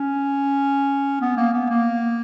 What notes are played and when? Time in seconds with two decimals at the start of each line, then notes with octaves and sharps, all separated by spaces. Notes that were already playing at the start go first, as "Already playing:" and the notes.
Already playing: C#4
1.21 B3
1.37 A#3
1.53 B3
1.70 A#3